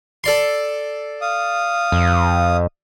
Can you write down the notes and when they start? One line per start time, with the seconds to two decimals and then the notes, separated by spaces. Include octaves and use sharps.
0.24 A4 D5 C6
1.21 F5 D#6
1.92 F2